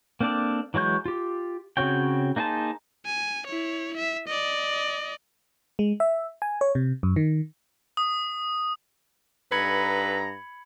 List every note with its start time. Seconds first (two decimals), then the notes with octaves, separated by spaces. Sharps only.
0.21 A#3 C4 D4 A4 D5
0.74 E3 F#3 G#3 C#6 G6
1.05 F4 G4
1.77 C#3 C4 F#4 C#5 G5
2.36 A#3 D#4 G#4 C5 A5
3.06 G#5
3.47 E4 C#5
3.97 E5
4.27 D5 D#5
5.79 G#3
6.00 E5
6.42 G#5
6.61 C#5
6.75 C3
7.03 F#2
7.16 D#3
7.97 D#6
9.52 G2 D#4 A4 B4 A#5 B5 G#6 C#7